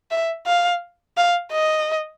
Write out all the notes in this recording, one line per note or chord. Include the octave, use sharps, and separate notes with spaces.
E5
F5
F5
D#5